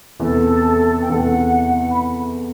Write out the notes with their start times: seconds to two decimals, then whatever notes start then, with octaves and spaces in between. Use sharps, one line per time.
0.20 E2 C3 E3 A3 A4
1.03 G5
1.08 E2 C3 E3 A3 F#5
1.91 B5